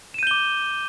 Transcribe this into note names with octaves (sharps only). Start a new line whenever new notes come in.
D6 G6 D#7 E7 G7